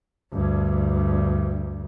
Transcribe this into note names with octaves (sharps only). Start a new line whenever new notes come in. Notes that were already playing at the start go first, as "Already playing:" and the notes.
D2 G2